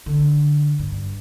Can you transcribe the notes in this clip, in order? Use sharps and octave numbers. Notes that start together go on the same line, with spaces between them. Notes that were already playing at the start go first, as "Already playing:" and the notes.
D3
G2